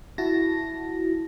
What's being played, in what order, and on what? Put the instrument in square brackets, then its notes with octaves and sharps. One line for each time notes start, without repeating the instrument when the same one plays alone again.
[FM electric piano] E4 F#4 A5 A#6